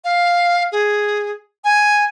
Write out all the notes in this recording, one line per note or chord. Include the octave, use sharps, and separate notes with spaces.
F5
G#4
G#5